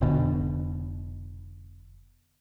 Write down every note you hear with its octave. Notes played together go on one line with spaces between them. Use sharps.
F1 B2 D3